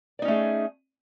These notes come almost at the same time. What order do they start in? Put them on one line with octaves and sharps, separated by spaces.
D5 D#4 C#4 A3 G#4